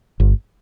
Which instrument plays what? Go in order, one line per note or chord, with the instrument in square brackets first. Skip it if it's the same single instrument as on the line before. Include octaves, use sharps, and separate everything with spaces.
[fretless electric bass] G1